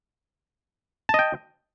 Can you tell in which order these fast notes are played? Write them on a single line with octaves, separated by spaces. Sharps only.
A5 D#5 G5